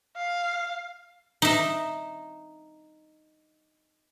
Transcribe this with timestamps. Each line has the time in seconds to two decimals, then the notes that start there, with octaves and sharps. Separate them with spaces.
0.16 F5
1.42 D#4 E5